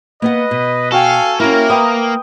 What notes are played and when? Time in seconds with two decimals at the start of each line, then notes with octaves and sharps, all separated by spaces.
0.22 A#3 B3 B4 D#5 F#5
0.51 B2
0.92 F#4 A4 F5 G5 G#5
1.40 A#3 C#4 E4 A#4
1.70 B4 G5 D#6